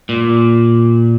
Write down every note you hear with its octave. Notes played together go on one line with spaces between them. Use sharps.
A#2